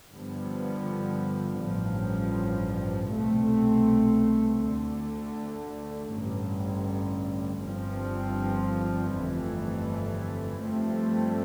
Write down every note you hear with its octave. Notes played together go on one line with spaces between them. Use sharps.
G2 D3 F3 B3
A1 G2 F3
C2 B2 A3 C4
D2 D3 A3
A1 G2 D3
G1 G2 F3 C4
G1 F2 E3 A3
G2 F3 A3 C4